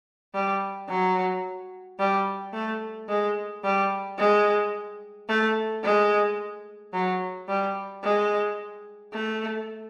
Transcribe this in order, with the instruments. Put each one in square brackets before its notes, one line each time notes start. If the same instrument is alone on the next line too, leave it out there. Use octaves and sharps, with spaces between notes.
[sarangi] G3
F#3
G3
A3
G#3
G3
G#3
A3
G#3
F#3
G3
G#3
A3